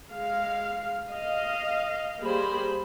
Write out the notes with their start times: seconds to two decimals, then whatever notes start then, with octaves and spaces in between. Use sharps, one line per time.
0.11 G#3 F5
1.12 D#5 F5
2.21 G3 A#3 G4 G#4 C5 B5